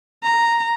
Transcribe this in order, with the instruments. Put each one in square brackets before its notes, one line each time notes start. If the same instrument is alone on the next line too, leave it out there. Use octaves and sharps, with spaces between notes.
[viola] A#5